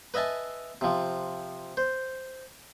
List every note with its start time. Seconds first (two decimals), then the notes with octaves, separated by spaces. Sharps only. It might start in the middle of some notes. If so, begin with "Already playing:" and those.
0.14 B4 D#5 E5 G#5 A5
0.81 C3 F3
1.77 C5